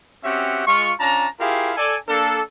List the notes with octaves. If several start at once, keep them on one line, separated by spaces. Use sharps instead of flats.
C4 C#4 F#4 G4 E5 F#5
G#3 F4 C#6
C#4 D4 F4 A5 A#5
E4 F4 G4 G#4 A#4 F5
A4 D5 G#5
A#3 D4 A4